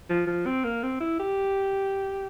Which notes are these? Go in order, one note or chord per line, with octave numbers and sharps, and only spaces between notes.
F3
F3
C4
A#3
C4
E4
G4